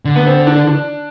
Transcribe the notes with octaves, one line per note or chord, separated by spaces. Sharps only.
D3
B3
C4
D4
D4